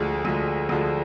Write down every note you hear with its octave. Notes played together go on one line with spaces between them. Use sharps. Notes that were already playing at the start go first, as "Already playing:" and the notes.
Already playing: D2 D3 F3 G#3 G#4
D2 D3 F3 G#3
D2 D3 F3 G#3